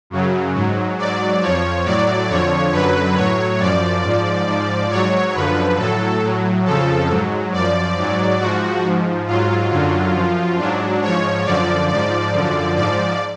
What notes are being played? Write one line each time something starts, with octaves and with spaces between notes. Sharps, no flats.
F#2 C#3 F#3
G#2 F#3
G#2 F#3 D5
F2 F3 C#5
A2 F#3 D5
F2 D3 F3 C#5
F#2 D3 F#3 B4
A2 F#3 C#5
F#2 F3 D5
G#2 F3
G#2 F3
G#2 F#3 C#5
F#2 D3 F3 B4
A2 F#3 A4
A2 F#3
F2 C#3 F3 A4
G#2 F#3
F#2 F3 D5
G#2 F#3
G#2 F3 F#4
G#2 F3
G#2 F#3 F4
F#2 D3 F#3
F#2 F3
G#2 F#3 D4
G#2 F3 C#5
F#2 D3 F3 D5
G#2 F3 D5
F#2 D3 F3
G#2 F3 D5